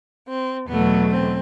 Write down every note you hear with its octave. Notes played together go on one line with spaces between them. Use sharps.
C4
E2 B2 F#3 A3 B3
C4